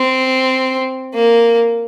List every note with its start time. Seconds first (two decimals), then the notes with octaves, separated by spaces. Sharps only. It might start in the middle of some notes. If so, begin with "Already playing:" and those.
Already playing: C4
1.14 A#3